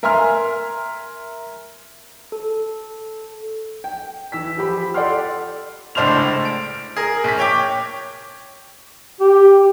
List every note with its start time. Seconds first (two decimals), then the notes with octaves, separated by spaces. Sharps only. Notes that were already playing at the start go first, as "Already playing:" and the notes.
0.03 A#4 E5 G#5 A#5 C6 F6
2.32 A4
3.84 G5
4.32 E3 E6 B6
4.58 F3 G4 B5
4.94 A4 D5 F#5 G5 C6 F6
5.95 C#2 A2 D4 C5 F6 F7
6.45 D7
6.96 G#4 A#4
7.24 A#1 B6
7.38 C#5 G5 D6
9.20 G4